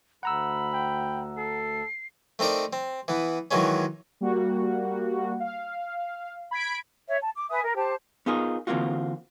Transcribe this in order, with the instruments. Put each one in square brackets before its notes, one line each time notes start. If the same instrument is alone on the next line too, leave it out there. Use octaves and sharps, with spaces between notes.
[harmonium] D2 [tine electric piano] F#5 A#5 E6 [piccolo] B5
[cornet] G5
[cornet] A4 [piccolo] C7
[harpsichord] A3 C4 D#4 A#4 D5
C4
E3 B3
D#3 E3 F#3 G#3 C#4
[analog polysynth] G3 A#3 F#4
F5
B5 G#6 B6 D7
[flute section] C#5 E5
A5
D6
B4 E5 G#5 D#6
A#4
G4 C5 A5
[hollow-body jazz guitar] B3 D#4 F4 G#4 A#4
D3 E3 A#3 C4 F4 F#4